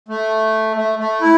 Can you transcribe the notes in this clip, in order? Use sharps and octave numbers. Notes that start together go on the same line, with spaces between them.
A3
A3
A3
E4